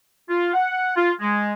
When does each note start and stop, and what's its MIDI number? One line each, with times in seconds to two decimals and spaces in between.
0.30 0.50 65
0.54 0.92 78
0.97 1.12 65
1.21 1.54 56